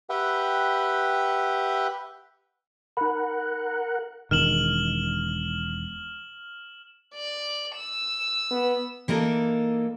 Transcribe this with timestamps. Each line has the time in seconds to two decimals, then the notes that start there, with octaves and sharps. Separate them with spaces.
0.10 G4 B4 E5 F#5 G5
2.97 D#4 A#4 F#5 B5
4.31 E1 D#3 F6 E7 F#7
7.15 D5
7.77 E6 E7
8.51 B3
9.08 E3 A#3 D#4 A4